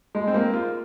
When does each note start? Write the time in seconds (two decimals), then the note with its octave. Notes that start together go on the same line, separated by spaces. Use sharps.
0.15 G#3
0.27 C4
0.34 A#3
0.54 F4